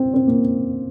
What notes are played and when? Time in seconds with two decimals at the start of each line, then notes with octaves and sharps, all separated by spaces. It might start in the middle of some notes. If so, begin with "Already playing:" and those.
Already playing: C4
0.14 C4
0.27 A#3